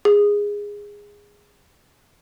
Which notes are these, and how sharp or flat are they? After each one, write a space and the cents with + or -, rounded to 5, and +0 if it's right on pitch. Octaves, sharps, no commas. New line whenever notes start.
G#4 -15